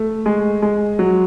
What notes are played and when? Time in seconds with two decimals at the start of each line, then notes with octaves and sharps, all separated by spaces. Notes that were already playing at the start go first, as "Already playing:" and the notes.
Already playing: A3
0.26 G#3
0.62 G#3
0.99 F#3